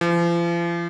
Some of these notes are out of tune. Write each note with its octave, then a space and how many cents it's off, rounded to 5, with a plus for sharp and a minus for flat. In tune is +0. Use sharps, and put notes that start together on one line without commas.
F3 -40